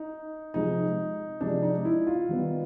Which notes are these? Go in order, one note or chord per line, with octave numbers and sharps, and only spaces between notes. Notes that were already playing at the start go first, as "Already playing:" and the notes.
Already playing: D#4
C3 F3 G#3 D#4
C3 F3 G#3 D4
D#4
E4
F4
D#3 G3 B3